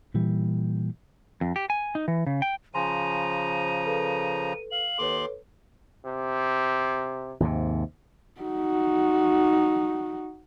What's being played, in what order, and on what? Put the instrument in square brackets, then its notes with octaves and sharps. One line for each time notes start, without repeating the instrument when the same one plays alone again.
[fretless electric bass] A#2 E3 G3
[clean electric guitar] F2
G4
G#5
D#4
E3
C#3
G5
[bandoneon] C#3 F3 A#5 [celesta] C5 G#5 C6 [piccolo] D#7
[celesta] A4 B4
[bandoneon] F5 [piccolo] F#7
[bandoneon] D#2 C6 D6 [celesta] A4 B4 C#5
[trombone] C3
[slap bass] D#2 G#2 C3
[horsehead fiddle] D#4 F#4